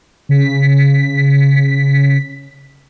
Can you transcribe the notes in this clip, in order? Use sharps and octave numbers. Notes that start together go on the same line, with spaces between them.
C#3 B6